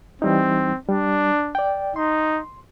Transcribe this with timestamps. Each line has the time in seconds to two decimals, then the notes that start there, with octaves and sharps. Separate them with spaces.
0.22 E3 G3 C4 D#4
0.88 G3 D4
1.55 D5 G5
1.96 D#4 C6